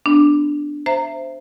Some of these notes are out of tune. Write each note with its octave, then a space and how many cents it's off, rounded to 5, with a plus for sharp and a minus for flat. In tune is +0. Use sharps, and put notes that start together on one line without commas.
B3 +20 D4 +0
C5 +0 E5 +20 A#5 -25